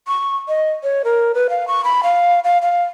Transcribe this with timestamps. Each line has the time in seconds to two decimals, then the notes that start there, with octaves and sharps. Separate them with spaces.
0.08 C#6
0.48 D#5
0.83 C#5
1.04 A#4
1.34 B4
1.50 F5
1.68 C#6
1.84 B5
2.03 F5
2.44 F5
2.62 F5